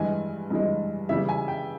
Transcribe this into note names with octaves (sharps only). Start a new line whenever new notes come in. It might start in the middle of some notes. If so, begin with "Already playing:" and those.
Already playing: G2 E3 G#3 G#5
G2 E3 G#3
C#3 E3 G3 E5
G#5
G5